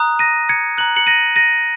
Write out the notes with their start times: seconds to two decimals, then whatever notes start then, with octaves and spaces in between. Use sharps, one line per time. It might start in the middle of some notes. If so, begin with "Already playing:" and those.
Already playing: A#5 D#6 F#6
0.19 A#6 D#7
0.49 G#6 C#7
0.78 A#5 F#6 F#7
0.96 C#7 F#7
1.07 A#6 D#7
1.36 A#6 D#7